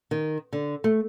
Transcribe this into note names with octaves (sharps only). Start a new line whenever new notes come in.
D#3
D3
A3